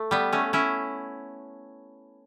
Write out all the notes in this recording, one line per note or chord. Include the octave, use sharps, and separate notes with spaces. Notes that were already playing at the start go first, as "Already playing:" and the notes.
Already playing: A3
G3 B3
A3 C#4
C#4 E4